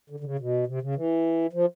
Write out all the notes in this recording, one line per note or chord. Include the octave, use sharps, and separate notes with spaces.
D3
D3
C#3
B2
C3
C#3
E3
F3